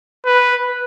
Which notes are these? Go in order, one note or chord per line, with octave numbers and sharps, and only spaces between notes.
B4